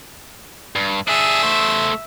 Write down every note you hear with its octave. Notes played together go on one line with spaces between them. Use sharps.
G2
D4 G#4 E5
A3 C5